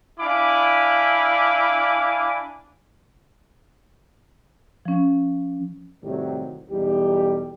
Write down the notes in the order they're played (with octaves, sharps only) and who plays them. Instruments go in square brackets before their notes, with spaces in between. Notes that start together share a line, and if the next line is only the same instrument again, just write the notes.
[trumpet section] D4 E4 F5 G#5 B5 D6
[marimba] F3 C#4
[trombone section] A2 C3 D#3 F#3 G3 G4
B1 E2 G3 D#4 G4